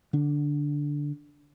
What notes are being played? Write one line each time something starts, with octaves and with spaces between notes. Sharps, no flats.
D3 D4